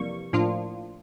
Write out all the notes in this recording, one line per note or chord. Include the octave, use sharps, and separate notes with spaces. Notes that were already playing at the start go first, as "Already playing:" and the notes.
Already playing: F2 C3 E3 G3 A#3 C#6
A2 F3 A#3 D4 F4